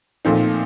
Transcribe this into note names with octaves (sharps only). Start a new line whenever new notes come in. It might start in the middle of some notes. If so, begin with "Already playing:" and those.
A#2 F3 A3 C4 D#4